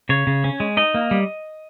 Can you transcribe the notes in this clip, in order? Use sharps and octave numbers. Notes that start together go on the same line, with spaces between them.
C#3 C#5
C#3
C#4
G#3
D#4 D#5
A#3
G3